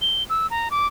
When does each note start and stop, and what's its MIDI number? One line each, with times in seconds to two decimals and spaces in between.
0.02 0.24 103
0.30 0.47 88
0.50 0.69 82
0.71 0.87 86